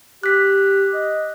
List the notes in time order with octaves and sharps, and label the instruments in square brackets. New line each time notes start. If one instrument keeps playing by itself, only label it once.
[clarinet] G4 [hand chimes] F#6 B6
[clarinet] D#5